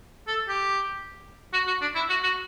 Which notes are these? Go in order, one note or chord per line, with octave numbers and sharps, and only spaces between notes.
A4
G4
F#4
F#4
D4
E4
F#4
F#4